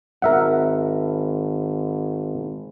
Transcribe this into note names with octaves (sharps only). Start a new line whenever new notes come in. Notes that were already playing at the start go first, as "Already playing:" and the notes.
G#1 A#4 E5 F#5